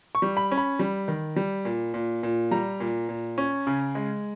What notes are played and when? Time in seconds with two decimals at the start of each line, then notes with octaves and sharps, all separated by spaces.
0.15 C#6
0.22 G3
0.37 B5
0.51 C#4
0.57 B5
0.79 G3
1.08 D#3
1.36 G3
1.65 A#2
1.94 A#2
2.23 A#2
2.51 G3 A#5
2.80 A#2
3.09 A#2
3.38 C#4
3.67 C#3
3.95 G#3